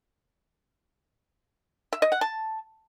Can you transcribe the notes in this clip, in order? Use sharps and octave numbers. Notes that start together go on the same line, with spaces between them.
E5
D#5
F#5
A5